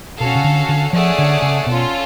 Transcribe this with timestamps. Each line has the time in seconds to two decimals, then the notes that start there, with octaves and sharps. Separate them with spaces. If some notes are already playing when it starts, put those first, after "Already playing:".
0.20 B2 C#4 F#4 A4 F5
0.35 C#3
0.44 D3
0.69 D3
0.93 F3 A3 C#4 G#4 D5 F#5
1.18 D3
1.42 C#3
1.67 B2 C#4 F4 A4